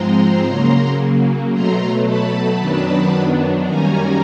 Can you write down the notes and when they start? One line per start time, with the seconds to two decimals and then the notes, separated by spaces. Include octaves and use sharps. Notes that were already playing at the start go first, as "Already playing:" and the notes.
Already playing: G#2 F3 G#3 C4 A#5 C6
0.46 C#3 F#3 A#3
1.52 B2 F#3 A3 A#5 C6
2.06 A5 B5
2.59 F#2 D#3 F#3 B3 D4
3.65 F#2 D#3 G3 A#3 C#4 G#5 A#5